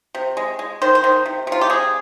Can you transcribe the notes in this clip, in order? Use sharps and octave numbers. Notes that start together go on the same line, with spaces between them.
C3
G#3
G#3
D#3 C5
C5
D#3
C3
C3 F4
G4
G#3 G#4